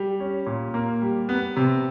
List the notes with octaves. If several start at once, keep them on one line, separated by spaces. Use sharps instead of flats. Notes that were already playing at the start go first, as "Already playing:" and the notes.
Already playing: G3
C#4
A#2
A#3
G3
B3
C3